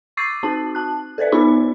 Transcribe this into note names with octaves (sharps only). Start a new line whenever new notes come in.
C#6 D6 E6 A6 C7 D#7
C4 D#4 F#4 A5
A5 F#6
A4 B4 C5 D5 E5
B3 D#4 F4 G4 B5